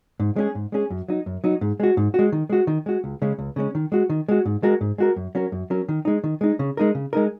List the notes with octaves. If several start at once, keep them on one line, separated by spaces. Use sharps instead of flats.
G#2
G#3 C#4 G#4
G#2
G#3 C#4 G#4
F#2
F#3 D#4
F#2
F#3 D#4
G#2
G#3 F#4
G#2
G#3 F#4
D#3
G#3 F#4
D#3
G#3 F#4
C#2
C#3 G#3 C#4
C#2
C#3 G#3 C#4
D#3
G#3 F#4
D#3
G#3 F#4
G#2
G#3 F#4 A#4
G#2
G#3 F#4 A#4
F#2
F#3 C#4 A#4
F#2
F#3 C#4 A#4
D#3
G#3 D#4
D#3
G#3 D#4
C#3
G#3 D#4 A#4
C#3
G#3 D#4 A#4